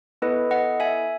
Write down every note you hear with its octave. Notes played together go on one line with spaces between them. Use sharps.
B3 E4 A4 B4 D#5
D#5 F#5
E5 G#5